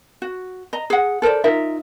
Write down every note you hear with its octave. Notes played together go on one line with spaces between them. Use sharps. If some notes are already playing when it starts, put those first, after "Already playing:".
F#4
D#5 A#5
G#4 F#5
A4 A#4 C5 D5
D#4 F4 A#4 E5